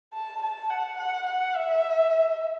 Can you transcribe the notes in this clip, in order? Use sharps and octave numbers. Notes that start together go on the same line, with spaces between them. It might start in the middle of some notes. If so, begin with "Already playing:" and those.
A5
A5
F#5
F#5
F#5
E5